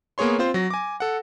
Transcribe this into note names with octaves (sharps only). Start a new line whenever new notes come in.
A#3 B3 G#4 C#5 C6
C4 F4 C5
F#3 A#6
G#5 D6
A4 F#5